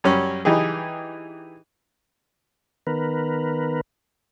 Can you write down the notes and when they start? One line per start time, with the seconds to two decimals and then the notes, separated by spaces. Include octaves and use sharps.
0.04 F#2 G3 C#4
0.45 E3 D#4 G4 G#4
2.87 D#3 B3 A#4 B4